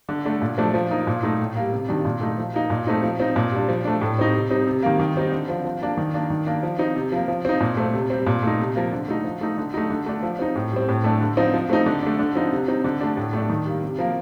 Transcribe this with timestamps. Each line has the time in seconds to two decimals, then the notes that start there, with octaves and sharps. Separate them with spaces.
0.09 D3
0.25 A3 D4
0.41 A#2
0.58 F3 A3 D4
0.74 F3
0.91 A#3 D#4
1.07 A#2
1.23 A3 D#4
1.39 A2
1.55 G3 A#3
1.72 C3
1.88 D#3 G3 D4
2.05 A#2
2.21 A3 D#4
2.38 F3
2.54 A#3 D#4
2.70 A#2
2.87 A3 C4 D#4
3.03 F3
3.20 C4 D#4
3.36 A#2
3.52 G3 D4
3.69 F3
3.85 A3 D4
4.01 A2
4.17 G3 C4 D#4
4.34 C3
4.50 G3 C4 D#4
4.67 C3
4.83 D#3 G3 A#3
4.99 D#3
5.16 G3 C4 D#4
5.32 D3
5.48 F3 C4
5.65 F3
5.81 A#3 D4
5.97 D#3
6.14 A#3 D4
6.30 D#3
6.46 A#3 D4
6.63 F3
6.79 C4 D#4
6.96 C3
7.12 F3 A#3
7.28 F3
7.45 C4 D#4
7.61 A#2
7.77 A3 C4
7.94 C3
8.10 G3 C4
8.27 A#2
8.43 A3 D#4
8.60 C3
8.76 F3 A#3
8.92 D3
9.08 A3 D#4
9.24 F3
9.41 A3 D#4
9.57 D3
9.74 A3 D#4
9.90 D3
10.06 A3 D4
10.23 F3
10.39 C4 D#4
10.56 A2
10.71 G3 C4
10.88 A2
11.04 A3 D4
11.21 D3
11.37 F3 C4 D#4
11.54 F3
11.69 A3 C4 D#4
11.86 D3
12.03 A3 D4
12.19 D3
12.35 F3 C4 D#4
12.52 C3
12.68 G3 C4 D#4
12.84 D3
13.01 A3 D4
13.17 A2
13.33 A3 D4
13.49 D#3
13.66 G3 A#3
13.82 C3
13.99 F3 A#3